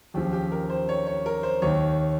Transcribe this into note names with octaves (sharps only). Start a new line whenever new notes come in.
D#2 C#3 F3 G4
G4
A#4
C5
C#5
C#5
A#4
C5
D#2 D#3 C#5